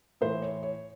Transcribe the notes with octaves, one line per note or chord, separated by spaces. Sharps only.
A2 E3 C5
C#5
C#5